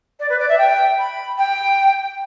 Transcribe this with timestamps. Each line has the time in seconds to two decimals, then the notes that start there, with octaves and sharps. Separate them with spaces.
0.20 D5
0.29 B4
0.39 D5
0.49 E5
0.58 G5
0.99 B5
1.38 G5